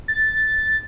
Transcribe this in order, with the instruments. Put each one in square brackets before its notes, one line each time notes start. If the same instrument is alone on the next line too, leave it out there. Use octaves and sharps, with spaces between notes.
[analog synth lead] A6